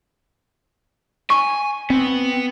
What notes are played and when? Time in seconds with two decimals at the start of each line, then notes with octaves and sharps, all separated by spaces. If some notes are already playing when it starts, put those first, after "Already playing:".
1.30 G#5 C#6
1.90 B3 C4